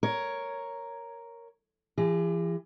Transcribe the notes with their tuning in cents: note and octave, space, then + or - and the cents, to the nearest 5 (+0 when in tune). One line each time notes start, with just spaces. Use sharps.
A#4 +0 C#5 +0
E3 +45 G#4 -40